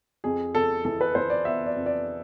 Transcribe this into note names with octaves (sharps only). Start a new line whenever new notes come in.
F2 G#4
F2 A4
E3 A4
B4
E3 C5
D5
B3 E5
D5
F2
D5